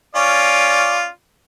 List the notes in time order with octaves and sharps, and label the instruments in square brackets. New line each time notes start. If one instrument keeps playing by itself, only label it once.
[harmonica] C#4 F4 D5